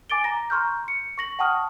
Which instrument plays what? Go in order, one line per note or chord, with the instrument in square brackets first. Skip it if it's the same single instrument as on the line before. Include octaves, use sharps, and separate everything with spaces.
[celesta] G#5 D6 A6 D7 G7
A#5 A#6
A#5 C6 C#6 F6 G6
C#7
C#6 A#6 F#7
F#5 G5 A5 C#6 D#6 F6